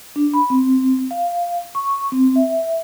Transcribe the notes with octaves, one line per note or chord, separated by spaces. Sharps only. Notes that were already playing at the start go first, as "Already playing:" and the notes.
D4
B5
C4
F5
C#6
C4
E5